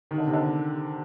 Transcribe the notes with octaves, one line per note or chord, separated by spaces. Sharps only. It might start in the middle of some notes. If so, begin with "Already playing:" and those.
D#3
D3
C3
D3